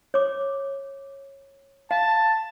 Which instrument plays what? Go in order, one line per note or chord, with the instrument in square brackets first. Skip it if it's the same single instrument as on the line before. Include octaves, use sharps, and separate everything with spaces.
[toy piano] C#5 D6
[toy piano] F5 [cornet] A5